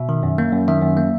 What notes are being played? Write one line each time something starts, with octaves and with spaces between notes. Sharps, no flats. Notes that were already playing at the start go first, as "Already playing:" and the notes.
Already playing: B2 E5
D#3
F#2
A#3
F#2
D#3 E5
F#2
A#3